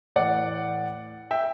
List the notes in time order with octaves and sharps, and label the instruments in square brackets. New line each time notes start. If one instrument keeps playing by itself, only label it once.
[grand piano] A2 E3 D5 F#5
E5 G5